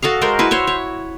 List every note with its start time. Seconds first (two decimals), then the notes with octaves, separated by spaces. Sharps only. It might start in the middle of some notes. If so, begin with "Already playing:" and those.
0.02 F#4 A4 D#5 F5
0.21 G#3 A#4 C5
0.39 E4 F#4 B4
0.51 C5 C#5 E5
0.67 C#5